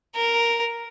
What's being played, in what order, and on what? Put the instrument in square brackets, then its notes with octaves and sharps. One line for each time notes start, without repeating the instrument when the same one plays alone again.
[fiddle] A#4